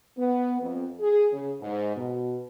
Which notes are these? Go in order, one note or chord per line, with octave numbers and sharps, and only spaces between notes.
B3
F2
G#4
C#3
G#2
B2